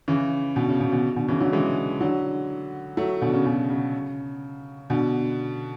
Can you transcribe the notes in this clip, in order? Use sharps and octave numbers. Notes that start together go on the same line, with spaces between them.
C#3 E3
B2 D3
C#3
B2
B2
B2 D3
C#3 E3
D3 F#3
E3 G#3
D3 F#3
F#3 A3
B2 D3
C#3
B2
C#3
B2 D3